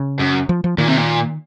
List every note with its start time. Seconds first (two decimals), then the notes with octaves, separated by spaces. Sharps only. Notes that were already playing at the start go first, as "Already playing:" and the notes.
Already playing: C#3
0.19 F#2
0.49 F3
0.64 F3
0.78 A#2 D#3
0.87 C3
0.96 A#2